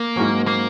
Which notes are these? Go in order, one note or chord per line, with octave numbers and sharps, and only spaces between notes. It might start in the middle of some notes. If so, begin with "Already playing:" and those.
Already playing: A#3
G#2 F#3 C#4
A#3